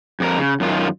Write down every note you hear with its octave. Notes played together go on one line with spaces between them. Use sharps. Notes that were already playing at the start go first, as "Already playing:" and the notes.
F2 D4 A#4
C#3
F#2 D#3 F4